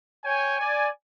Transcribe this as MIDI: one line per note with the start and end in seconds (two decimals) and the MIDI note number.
0.25 0.59 73
0.25 0.59 79
0.25 0.59 80
0.60 0.88 74
0.60 0.88 80